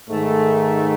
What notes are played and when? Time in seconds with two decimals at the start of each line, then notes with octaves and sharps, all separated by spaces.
0.10 G#2 D#3 A3